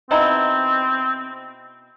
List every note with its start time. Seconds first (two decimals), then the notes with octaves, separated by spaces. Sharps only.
0.11 B2 C4 D#4 E4